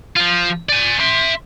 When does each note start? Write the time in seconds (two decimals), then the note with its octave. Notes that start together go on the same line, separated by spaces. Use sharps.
0.16 F3 F4
0.69 D5 G#5
1.00 E5 C6